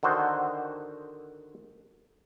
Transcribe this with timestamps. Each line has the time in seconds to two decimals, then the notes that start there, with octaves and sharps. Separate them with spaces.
0.03 D3 D#3 F#4 C5